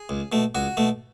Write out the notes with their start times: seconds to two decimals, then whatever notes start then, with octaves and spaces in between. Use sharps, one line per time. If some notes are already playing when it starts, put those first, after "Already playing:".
Already playing: G#4
0.09 C#2
0.32 B2 A3
0.55 C#2 F#4
0.77 B2 A3